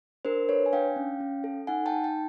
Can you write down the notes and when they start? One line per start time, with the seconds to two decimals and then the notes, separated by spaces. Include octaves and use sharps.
0.25 D4 A#4 C5
0.48 D4 B4 C#5
0.66 G#5
0.73 D4 F5 G5
0.96 C#4
1.20 C#4
1.44 A4
1.67 D#4 F#5 G#5
1.86 G5 A5
1.92 D#4
2.04 G5 A5